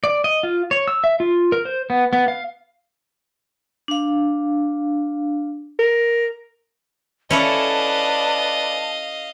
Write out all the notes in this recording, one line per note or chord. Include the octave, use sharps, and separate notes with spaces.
D5
D#5
F4
C#5
E6
E5
F4
A#4
C5
B3
B3
F5
D4 F5
A#4
C#4 E4 A4 B4 D5 D#5 F5 A5